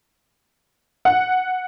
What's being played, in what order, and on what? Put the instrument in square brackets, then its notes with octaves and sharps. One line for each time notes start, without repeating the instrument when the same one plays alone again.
[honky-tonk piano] F#5